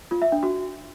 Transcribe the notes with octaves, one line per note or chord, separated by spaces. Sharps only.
F4
E5
D4
F#4